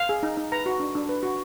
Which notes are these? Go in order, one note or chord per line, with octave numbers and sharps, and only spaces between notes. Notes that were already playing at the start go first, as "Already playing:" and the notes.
Already playing: F5
G#4
D#4
D#4
B4 A#5
F#4
D4
D4
B4
F#4